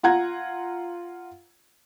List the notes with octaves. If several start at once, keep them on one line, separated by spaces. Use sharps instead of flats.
F4 F#5 A#5 G#6